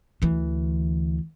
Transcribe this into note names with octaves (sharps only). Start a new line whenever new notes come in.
D2 E3